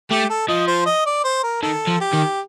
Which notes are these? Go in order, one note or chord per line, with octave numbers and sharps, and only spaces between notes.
A3 G4
A4
F3 D#5
C5
D#5
D5
C5
A#4
D#3 A4
F3
G4
D#3